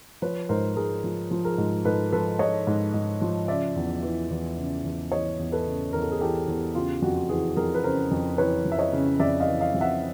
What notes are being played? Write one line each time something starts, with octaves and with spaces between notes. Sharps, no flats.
F3 B4 C#5
G#2 A#4 C5
G#2 G#4 A#4
F3
F3
G#4 A#4
G#2
G#2 A4 B4
F3 A4 B4
F3 C#5 D#5
G#2
G#2
F3
C#3 D5 E5
E2
E3
E2
C#3
E2
E3 C#5 D#5
E2
A4 B4
C#3
E2 A#4
A4
G#4
E3 G4 A4
E2
C#3 F4 G4
F2 F#4
E3 F#4 G#4
F2 G#4 A#4
B4
C#3 A#4 C5
F2
E3 B4 C#5
F2
E5
C#5 D#5
C#3
F2 D5 E5
D#5 F5
E3
D#5 F5
F2
E5 F#5